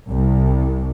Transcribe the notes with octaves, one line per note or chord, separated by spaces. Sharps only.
C2